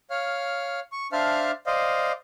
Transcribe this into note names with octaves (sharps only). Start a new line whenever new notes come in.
C#5 F5 F6
C#6
D4 C5 E5 F5 A5 F6
C5 D5 D#5 F5